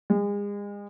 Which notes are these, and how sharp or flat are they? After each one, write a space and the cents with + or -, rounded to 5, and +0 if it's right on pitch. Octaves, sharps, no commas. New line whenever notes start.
G#3 -35